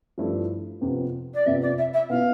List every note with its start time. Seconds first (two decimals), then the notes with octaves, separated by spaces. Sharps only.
0.18 G2 F3 A3 E4
0.81 F2 C3 F3 B3
1.34 D5
1.45 F2 C3 F3 B3 E5
1.62 D5
1.78 E5
1.93 E5
2.09 B2 B3 E4 F5